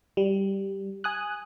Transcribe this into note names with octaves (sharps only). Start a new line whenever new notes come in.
G3
G#5 D#6 F#6